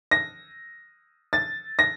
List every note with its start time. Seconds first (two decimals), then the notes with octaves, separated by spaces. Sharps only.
0.11 A#6
1.33 A6
1.79 A#6